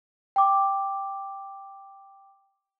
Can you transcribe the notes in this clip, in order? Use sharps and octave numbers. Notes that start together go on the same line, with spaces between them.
G5 D6